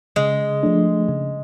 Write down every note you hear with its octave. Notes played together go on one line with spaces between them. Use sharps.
C#3 G#3
F3 A3 D4
C#3